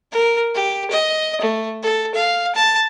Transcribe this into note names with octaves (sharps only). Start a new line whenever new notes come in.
A#4
G4
D#5
A3
A4
F5
A5